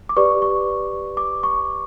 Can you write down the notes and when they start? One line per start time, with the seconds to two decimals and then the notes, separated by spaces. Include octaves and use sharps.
0.09 D6
0.17 G4 B4 D5 C#6
0.42 C#6
1.17 D6
1.43 C#6